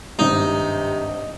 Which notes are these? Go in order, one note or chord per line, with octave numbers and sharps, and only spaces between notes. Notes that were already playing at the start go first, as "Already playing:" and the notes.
G#1 G2 C3 D#4